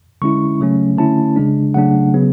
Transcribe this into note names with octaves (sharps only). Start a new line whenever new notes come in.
D3 G#3 C#4 E4 C#6
C#3 F#3 A3 C#4
D3 A3 C#4 E4 A5
C#3 G#3 D4
C#3 F#3 A3 D4 F#5
C#3 F#3 B3